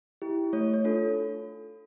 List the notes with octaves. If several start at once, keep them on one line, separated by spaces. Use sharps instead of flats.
E4 G4
A3 C#5
C#5
D4 F4 A4